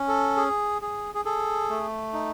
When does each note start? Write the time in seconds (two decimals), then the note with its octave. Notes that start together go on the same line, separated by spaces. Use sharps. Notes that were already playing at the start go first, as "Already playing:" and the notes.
Already playing: C#4
0.08 A4
0.37 G#4
0.82 G#4
1.14 G#4
1.25 G#4 A4
1.70 A3
2.13 D#4